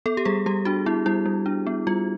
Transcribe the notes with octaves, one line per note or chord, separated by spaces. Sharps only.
B3 A4
G4
G3 G#4
G3 G4
D4 F#4
B3 E4
G3 E4
G3
D4
B3
G3 F4